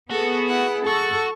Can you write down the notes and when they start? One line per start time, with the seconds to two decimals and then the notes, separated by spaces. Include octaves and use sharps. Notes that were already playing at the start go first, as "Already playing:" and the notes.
0.11 B3 F#4 G#4 A4
0.47 E4 F#5
0.87 F#4 A4 C#6